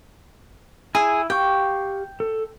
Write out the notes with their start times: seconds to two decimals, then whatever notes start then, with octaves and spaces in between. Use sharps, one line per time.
0.95 E4 G#4 E6
1.30 G4 F5 G5 C#6
2.20 A4